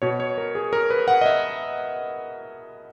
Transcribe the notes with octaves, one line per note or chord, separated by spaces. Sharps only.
B2 C#5
C#5
A#4
G#4
A#4
B4
F#5
D#5
E5